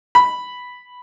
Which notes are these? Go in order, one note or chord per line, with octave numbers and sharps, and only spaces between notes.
B5